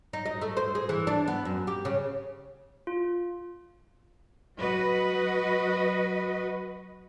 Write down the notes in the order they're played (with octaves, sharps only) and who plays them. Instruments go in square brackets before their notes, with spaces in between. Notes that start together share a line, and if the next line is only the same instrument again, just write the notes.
[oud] D#4
D#5
A3
C5
G#4
E3
D4
B3
F#2
G4
C#3
[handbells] F4
[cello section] F#3 F#4 B4 D#5